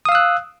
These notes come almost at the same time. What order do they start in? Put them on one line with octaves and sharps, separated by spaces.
D#6 F5 E6 F#6